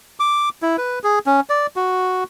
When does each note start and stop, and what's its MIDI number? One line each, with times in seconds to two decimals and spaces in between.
0.20 0.49 86
0.62 0.77 64
0.78 0.99 71
1.04 1.19 68
1.26 1.40 61
1.49 1.67 74
1.76 2.24 66